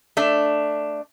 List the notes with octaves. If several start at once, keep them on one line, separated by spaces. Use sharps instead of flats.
A3 D4